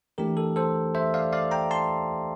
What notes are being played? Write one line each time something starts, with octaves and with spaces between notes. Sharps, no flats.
E3 A3 D4 G4 A#4
A4
A4 C5
C5 E5
D5 F5
D5 F5
G5 A#5
A5 C6